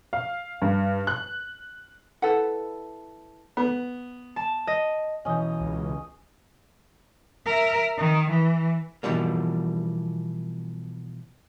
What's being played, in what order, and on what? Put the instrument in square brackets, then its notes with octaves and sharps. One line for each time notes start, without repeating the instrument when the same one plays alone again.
[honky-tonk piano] F5
G2
F#6
[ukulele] E4 A4 B4 F#5
[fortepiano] B3
[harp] A5
D#5
[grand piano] B1 E3 G6 [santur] C#4 D#5
[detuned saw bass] C#2
[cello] A#4 E5
D#3
E3
[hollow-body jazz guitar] B2 E3 F3 G3 A#3